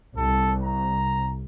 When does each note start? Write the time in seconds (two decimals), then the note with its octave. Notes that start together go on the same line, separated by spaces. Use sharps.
0.17 C2 A4
0.63 A#5